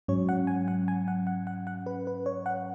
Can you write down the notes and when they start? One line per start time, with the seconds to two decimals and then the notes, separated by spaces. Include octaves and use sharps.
0.08 G#2 F#3 C#4 C#5
0.29 F#5
0.47 G#5
0.68 F#5
0.88 G#5
1.08 F#5
1.27 F#5
1.47 F#5
1.67 F#5
1.86 B4
2.07 B4
2.26 C#5
2.46 F#5